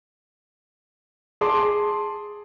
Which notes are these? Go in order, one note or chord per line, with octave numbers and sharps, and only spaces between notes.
G#4 A5 C6 D6